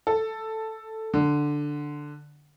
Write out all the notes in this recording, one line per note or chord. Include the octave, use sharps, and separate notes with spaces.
A4
D3